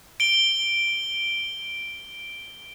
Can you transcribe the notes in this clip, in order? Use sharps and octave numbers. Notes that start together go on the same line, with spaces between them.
D7 G7